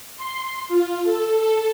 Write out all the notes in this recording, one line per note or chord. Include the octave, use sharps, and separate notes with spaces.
C6
F4
A4
A4